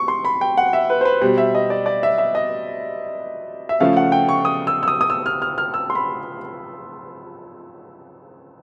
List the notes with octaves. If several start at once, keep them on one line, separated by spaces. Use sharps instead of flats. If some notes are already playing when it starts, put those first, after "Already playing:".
Already playing: C#6
C6
B5
G5
F#5
E5
B4
C5
B4
B2 G3 C5
E5
D#5
D5
D5
E5
E5
D#5
E5
C#3 F3 A3 F5
F#5
G5
C#6
D#6
E6
E6
D#6
D#6
E6
F6
F6
F6
E6
C6
B5